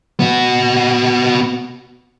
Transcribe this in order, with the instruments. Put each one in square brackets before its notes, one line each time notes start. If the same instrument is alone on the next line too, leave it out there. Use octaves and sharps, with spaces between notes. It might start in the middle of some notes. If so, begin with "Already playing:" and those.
[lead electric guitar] B3 F#4